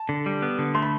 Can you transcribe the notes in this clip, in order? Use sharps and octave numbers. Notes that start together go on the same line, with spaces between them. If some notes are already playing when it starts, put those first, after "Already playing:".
Already playing: A5
D3
G3
B3
D3
A3 C6
B5